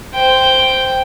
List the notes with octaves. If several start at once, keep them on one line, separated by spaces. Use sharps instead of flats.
C5 G5